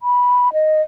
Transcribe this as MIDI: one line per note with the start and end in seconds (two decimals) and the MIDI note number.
0.02 0.52 83
0.53 0.81 75